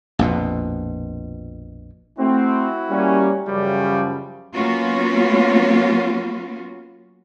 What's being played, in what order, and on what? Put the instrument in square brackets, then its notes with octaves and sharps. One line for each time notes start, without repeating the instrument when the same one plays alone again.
[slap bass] A#1 F2 B2
[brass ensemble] A3 C4 [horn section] E4 F#4
[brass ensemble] G3 A#3 C#4
[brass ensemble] F#2 C#3 F3 [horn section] G3
[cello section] F#3 A#3 B3 C#4 F4 F#4